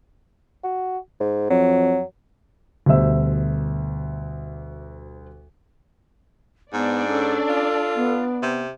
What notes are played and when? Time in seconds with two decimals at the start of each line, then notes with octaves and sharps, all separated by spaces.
0.64 F#4
1.20 G#2
1.50 F2 F#3
2.86 D2 B2 G3 C5 E5 E6
6.73 G#2 B3 D4 D5
7.08 C#4 A4
7.49 F4
7.95 B3
8.42 C3